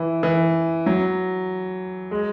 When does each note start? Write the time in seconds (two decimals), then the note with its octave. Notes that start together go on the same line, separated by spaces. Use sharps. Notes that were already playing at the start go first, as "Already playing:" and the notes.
Already playing: E3
0.23 E3
0.86 F#3
2.11 G#3